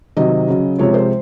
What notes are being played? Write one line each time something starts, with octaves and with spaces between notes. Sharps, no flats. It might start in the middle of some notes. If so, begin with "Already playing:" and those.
C3 D#3 F#3 D#5
C#3 F#3
C3 F3 G#3 C#5
C5